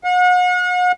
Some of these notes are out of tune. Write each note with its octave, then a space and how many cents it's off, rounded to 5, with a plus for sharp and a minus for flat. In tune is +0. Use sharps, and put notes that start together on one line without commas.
F#5 -40